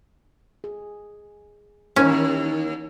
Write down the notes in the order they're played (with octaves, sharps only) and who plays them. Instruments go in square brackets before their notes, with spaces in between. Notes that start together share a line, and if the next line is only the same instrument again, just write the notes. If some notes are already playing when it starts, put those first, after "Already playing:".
[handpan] G#4
[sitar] D#2 [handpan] E3 A#4 C#5 [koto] C#4